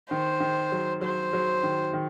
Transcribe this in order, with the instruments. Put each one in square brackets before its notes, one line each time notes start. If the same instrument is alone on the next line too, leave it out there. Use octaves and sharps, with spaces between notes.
[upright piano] D#3 [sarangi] C5
[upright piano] D#3
F#3
[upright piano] F#3 [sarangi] C5
[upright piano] F#3
D#3
D#3